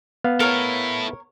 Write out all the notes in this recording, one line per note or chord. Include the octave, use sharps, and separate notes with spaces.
B3 F5
E4 A4 A#4 C#5